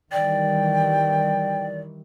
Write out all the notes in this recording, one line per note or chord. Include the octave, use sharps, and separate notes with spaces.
D#3 E3 G3 D5 G5